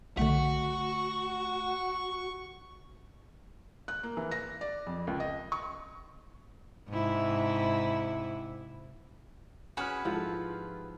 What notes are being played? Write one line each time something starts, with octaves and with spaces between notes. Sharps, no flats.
B1 D3 A3 F#4 C#6
F#6
A#3
E3
A#6
D5
F2
C#2
D#5
C#6
G#2 C3 E4
C#4 F#4 G#4 B4 B5 F6
G#2 F3 E4 F4 G4 A4